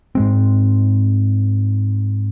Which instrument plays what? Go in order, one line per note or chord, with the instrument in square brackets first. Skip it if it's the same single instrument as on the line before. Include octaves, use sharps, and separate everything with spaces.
[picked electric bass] G#2 G#3 C4